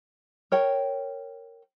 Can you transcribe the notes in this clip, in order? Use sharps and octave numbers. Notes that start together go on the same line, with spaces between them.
A#4 C#5 G5